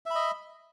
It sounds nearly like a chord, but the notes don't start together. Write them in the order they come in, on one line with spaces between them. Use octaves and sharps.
E5 B5 D#5